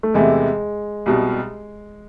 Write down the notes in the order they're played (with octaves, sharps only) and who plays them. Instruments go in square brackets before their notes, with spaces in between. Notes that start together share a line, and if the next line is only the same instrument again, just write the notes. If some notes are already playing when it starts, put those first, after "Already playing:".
[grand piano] A3
[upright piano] E2 C3 E3 A3 [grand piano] G#3
[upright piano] C2 B2 G3